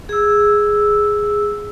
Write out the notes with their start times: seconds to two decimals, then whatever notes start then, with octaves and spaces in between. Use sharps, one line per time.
0.09 G#4 E6